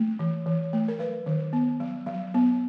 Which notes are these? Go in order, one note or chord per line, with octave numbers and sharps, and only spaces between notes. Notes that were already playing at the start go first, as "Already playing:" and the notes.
Already playing: A3
E3
E3
A3
A#4
F#3 B4
D#3
B3
F#3
F#3
B3